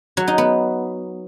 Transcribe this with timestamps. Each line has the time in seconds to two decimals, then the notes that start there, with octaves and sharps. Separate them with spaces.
0.17 F#3
0.28 D#4
0.38 B3